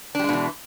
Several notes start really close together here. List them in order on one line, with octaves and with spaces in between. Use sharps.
D4 G3 G#3 B2 E3